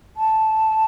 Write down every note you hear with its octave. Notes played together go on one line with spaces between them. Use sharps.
A5